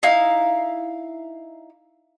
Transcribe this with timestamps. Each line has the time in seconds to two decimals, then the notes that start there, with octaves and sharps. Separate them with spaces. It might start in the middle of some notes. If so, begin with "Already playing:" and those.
0.03 D#4 E4 F5